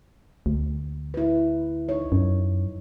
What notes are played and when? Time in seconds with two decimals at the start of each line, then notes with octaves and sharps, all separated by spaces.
0.46 D2
1.14 E4 B4
1.89 D#4 C#5
2.12 F#2